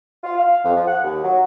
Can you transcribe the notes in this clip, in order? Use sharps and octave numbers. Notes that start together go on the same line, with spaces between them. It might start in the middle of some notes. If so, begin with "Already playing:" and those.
F4
F5
F2
F3
F#5
D#2
F#3